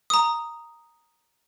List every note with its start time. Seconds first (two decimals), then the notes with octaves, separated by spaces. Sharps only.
0.10 A#5 D#6